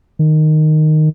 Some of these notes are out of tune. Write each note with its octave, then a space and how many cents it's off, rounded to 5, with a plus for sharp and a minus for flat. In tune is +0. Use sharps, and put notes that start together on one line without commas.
D#3 -10